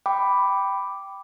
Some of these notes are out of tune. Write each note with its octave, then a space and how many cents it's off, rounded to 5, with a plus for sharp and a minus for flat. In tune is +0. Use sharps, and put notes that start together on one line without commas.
G5 +0 B5 +5 D6 +0